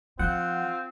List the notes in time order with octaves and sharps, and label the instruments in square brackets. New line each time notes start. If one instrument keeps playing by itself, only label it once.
[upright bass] F3 [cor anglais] C4 [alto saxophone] F4 [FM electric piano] F#5